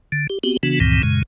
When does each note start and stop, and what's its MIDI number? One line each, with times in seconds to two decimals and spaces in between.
0.12 0.27 50
0.30 0.39 67
0.43 0.57 59
0.43 0.57 60
0.43 0.57 66
0.43 0.57 67
0.63 0.79 49
0.63 0.79 52
0.63 0.79 59
0.63 0.79 62
0.63 0.79 66
0.80 1.02 37
0.80 1.02 43
0.80 1.02 46
0.80 1.02 51
0.80 1.02 52
0.80 1.02 60
1.03 1.23 42
1.03 1.23 46
1.03 1.23 49
1.03 1.23 56